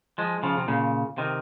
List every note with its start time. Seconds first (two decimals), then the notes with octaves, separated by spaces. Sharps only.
0.18 F3 G#3
0.43 C#3 F3
0.57 C3
0.68 A#2 C#3
1.18 C3 D#3